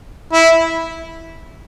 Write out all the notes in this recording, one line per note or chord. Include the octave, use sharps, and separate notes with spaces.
E4